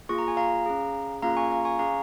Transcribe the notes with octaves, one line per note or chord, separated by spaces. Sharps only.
A#3 F4 G#4 C#6
A#5
G#5
F5 A#5
C#4 G#4
A#3 C#4 F4 G#4 F5 A#5
G#5 C#6
F5 A#5
G#5 C#6
C#4 G#4 F5 A#5